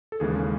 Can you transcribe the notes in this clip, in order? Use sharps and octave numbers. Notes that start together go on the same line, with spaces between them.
A4
D#2 C#3 E3 G#3 G#4
C#4